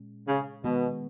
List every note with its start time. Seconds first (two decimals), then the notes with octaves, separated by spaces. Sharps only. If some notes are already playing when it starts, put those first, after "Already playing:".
Already playing: A#2 G#3 C#4
0.27 C#3
0.64 B2 D#3 G#3 B3 F#4